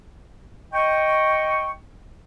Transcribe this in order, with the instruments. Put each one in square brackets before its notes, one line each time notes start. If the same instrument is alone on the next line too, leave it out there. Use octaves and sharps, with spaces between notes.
[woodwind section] D#5 G5 C#6